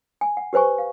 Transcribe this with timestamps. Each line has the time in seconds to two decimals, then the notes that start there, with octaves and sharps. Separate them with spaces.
0.21 G#5
0.37 F#5
0.53 G4 B4 C5 G#5 C#6
0.78 F5